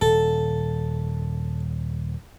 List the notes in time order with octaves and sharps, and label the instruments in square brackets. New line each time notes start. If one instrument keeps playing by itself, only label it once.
[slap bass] D#1 [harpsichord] A4